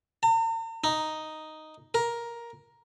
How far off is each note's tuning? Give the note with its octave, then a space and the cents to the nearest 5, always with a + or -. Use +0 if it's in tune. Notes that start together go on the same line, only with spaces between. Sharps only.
A#5 -45
D#4 +0
A#4 +10